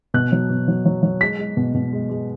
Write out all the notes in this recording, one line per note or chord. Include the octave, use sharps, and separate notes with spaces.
B2 F#6
F#3
B2
F#3
F#3
F#3
G#3 B6
G#3
B2
B2
G#3
G#3